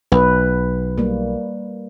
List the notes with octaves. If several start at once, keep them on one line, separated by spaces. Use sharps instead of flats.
B1 B4
G3 A#3